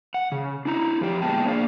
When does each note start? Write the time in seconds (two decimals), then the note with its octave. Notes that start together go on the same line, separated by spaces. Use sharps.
0.14 F#5
0.32 C#3
0.65 D4 E4 A#5
1.01 F2 G4
1.22 A#2 G#3 B3 G5 A5
1.45 A3 A#3 D4 G#4 D5 F5